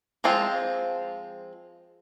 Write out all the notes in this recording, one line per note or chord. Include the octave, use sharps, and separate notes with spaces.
F3 G#3 C4 F4